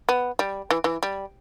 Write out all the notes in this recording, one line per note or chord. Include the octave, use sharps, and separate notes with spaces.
B3
G3
E3
E3
G3